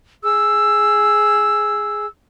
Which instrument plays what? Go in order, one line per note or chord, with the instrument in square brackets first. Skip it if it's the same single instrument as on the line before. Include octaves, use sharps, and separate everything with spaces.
[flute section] G#4 E6